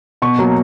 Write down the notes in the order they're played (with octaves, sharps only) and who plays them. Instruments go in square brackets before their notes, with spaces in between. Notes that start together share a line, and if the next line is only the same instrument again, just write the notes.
[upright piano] B2 C#6
F#3 A#3